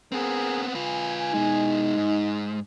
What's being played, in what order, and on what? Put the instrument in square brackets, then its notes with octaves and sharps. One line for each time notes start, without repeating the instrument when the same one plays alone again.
[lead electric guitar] B3 C4 [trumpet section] G#4 A#4
[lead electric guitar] F4 B4 [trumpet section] G#5
[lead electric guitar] B2 G#3 [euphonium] D#4
[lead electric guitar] G#2 [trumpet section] G#3